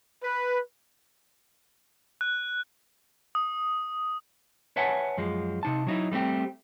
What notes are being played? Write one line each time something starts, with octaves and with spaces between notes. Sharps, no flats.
B4
F#6
D#6
B4 C#5 E5 F#5 G#5 A5
F#2 F3 G#3
C3 D#4 A5
F#3 D#4 E4
G3 A3 C4 G4